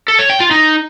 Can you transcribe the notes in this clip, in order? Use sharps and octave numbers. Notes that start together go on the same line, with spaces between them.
A4
C#5
G5
F4
D#4